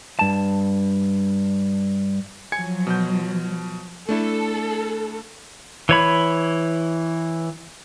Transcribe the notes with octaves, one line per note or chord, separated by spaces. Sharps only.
G2 A5
F3 F#3 G#5 G#6 C#7
B2 G6
A3 D4 E4 A4
E3 C#5 B5